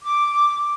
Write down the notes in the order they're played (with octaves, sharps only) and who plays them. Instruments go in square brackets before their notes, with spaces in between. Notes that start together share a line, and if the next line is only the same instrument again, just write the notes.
[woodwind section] D6